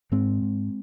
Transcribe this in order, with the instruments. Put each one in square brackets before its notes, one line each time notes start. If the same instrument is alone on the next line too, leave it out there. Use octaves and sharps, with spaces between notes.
[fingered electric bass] G#2 G#3 C4
G#2